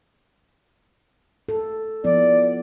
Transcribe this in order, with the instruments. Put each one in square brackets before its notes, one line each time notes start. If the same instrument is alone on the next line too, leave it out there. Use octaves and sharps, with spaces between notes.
[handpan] A4
[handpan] F3 B3 E4 [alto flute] D5